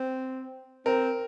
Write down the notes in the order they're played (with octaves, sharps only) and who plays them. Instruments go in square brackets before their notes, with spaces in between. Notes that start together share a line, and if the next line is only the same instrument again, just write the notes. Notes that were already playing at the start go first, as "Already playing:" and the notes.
Already playing: [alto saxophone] C4
[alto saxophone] C4 [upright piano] A#4